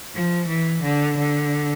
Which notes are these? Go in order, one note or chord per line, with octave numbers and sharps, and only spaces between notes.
F3
E3
D3
D3